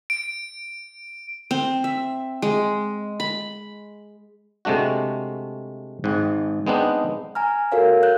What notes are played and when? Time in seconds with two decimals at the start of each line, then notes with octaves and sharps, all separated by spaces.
0.10 D7
1.51 C4
1.84 E5
2.42 G#3
3.20 B5
4.65 C3 G#3 A3 D4 F#4
6.04 G#1 G#2
6.67 G#3 B3 C4 D4 D#4
7.35 G#5 A#5 F6
7.72 F#4 A4 A#4 C#5 F5
8.03 F#6 G6